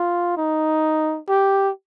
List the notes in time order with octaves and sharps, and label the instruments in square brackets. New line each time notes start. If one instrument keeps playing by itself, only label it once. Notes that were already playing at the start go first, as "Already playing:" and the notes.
Already playing: [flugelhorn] F4
D#4
G4